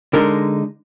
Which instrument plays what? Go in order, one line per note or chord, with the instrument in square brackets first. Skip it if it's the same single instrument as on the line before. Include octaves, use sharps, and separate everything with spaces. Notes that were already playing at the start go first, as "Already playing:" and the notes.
[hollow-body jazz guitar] D3 G#3 D#4 A#4